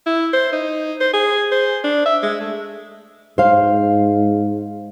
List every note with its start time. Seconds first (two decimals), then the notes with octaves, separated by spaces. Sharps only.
0.06 E4
0.33 C5
0.53 D#4
1.00 C5
1.13 G#4
1.52 C5
1.84 D4
2.06 E5
2.23 G#3
2.41 A3
3.38 G#2 C5 F5